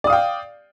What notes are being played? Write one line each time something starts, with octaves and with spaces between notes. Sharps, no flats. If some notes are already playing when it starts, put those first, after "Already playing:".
D5 F5 G5 D#6